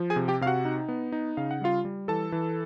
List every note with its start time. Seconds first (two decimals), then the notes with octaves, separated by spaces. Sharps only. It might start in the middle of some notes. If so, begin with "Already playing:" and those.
Already playing: F3
0.10 G#4 G#5
0.16 C3
0.28 G4 G5
0.41 C3 F5
0.46 F#4 F#5
0.65 D#4
0.88 B3
1.12 D#4
1.37 C#3 F5
1.51 F#5
1.61 G3 F4 F5
1.85 G3
2.08 E3 A4 A5
2.32 E3